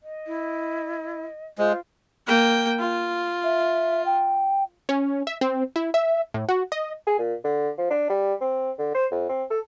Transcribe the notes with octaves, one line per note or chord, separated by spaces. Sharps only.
D#5
E4
G#3 F4 C5
A#3 G5
F4
E5
G5
C#4
E5
C4
E4
E5
A2
F#4
D#5
G#4
A#2
D3
F3
D4
G3
C4
D3
C5
F2
C4
A4